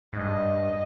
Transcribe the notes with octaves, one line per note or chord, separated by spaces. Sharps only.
G#2
G2 D#5